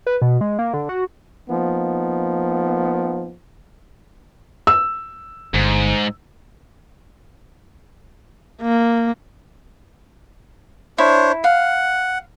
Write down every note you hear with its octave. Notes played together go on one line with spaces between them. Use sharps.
B4
B2
G#3
A#3
D3
F#4
F3 A#3 B3 D#4
E6
G1 G#2
A#3
D4 E4 C5 C#5
F5 F#5